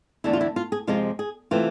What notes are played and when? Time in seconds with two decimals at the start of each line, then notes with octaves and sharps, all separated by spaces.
0.24 E2 D3 A3 E4
0.33 F4
0.41 E4
0.56 F4
0.72 G#4
0.87 F2 C3 F3 G#3 F4
1.19 G#4
1.51 C3 E3 A3 C4 F4